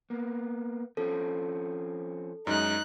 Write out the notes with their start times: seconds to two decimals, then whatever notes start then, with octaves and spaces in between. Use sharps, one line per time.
0.10 A#3 B3
0.97 F3 C4 C#4 A4
2.47 F#2 G#3 D#4 F#6